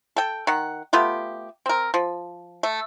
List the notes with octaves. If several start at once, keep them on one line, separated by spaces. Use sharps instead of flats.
A4 G5
D#3 F#5
A3 B3 F4 G4
C4 A#4
F3
A3